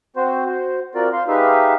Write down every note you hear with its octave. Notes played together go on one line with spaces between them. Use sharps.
C4 F#4 C5
F#4 C5
C4 F4 F#4 A#4 D5
C5 F5 C6
G#3 D#4 G4 B4 E5 F5